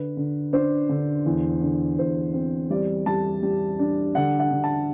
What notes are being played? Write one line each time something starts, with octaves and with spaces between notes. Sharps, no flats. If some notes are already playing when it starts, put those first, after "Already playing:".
Already playing: D3 B4
D3
D4 C5
D3
E2
D3
E2 C5
C4
G3 D5
G3 A5
G3
D4
D3 F#5
F#5
D3
A5